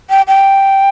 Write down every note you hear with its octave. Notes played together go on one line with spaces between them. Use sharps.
G5
G5